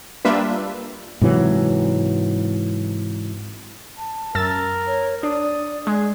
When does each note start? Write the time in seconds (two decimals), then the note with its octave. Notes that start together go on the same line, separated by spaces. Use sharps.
0.25 G3 A#3 D4 F4 B4 E5
1.21 G#2 C3 E3 F#3
3.98 A5
4.35 F#2 A#4 E6 A6
4.87 C#5
5.23 D4 D5 D#6
5.87 G#3 G#4